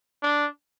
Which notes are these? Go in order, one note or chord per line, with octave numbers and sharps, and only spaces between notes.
D4